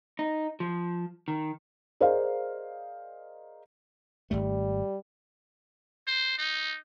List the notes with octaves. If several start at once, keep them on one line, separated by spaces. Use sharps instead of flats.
D#4
F3
D#3
G#4 A#4 C5 D5 D#5 F5
G#1 G#2 G3 A3
C5
D#4